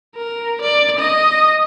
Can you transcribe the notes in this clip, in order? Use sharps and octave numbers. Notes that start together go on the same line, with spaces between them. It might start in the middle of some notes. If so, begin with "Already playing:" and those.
A#4
D5
D#5